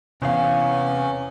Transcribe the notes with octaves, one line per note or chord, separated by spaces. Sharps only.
E2 C3 C#4 F5